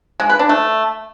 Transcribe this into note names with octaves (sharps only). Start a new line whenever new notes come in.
G#3
B4
D4
A3